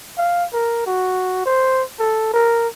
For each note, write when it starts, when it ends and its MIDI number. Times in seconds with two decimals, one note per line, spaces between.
0.18 0.45 77
0.53 0.84 70
0.86 1.42 66
1.46 1.83 72
1.99 2.29 69
2.34 2.68 70